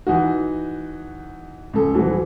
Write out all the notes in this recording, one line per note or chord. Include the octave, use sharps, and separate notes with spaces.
E3 D#4 F#4
C#2 A4
D#1 E3 F#3